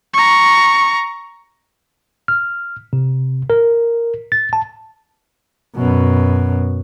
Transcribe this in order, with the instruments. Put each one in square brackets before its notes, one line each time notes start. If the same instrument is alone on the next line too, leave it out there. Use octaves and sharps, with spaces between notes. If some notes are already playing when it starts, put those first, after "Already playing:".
[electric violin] A#5 C#6
[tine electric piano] F6
C3
A#4
A6
A5
[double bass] F#2 B2